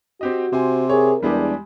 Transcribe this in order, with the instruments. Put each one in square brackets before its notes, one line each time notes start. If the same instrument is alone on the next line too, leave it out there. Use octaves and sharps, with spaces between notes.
[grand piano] C4 G4 D#5 [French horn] F#4
[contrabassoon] C3 [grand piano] C5 G#5
[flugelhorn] G#4 [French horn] A#4 [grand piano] C#5
[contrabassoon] E2 [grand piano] G3 G#3 G4 [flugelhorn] D4